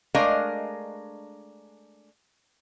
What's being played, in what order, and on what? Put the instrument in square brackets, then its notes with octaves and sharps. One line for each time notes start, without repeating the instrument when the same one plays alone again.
[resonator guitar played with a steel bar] G#3 A3 D4 A#4 D#5 F5